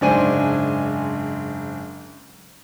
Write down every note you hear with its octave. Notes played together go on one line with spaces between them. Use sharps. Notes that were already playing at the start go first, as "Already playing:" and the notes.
F#1 G#2 D4 C5 G#5 D#7